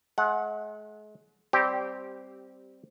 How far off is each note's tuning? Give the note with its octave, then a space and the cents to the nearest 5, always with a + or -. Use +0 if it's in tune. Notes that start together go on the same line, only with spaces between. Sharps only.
G#3 +40 F#5 -15
G3 +0 C4 +0 G4 -15